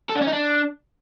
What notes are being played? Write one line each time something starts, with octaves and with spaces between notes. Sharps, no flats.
A4
D4
C#4
D#4
D4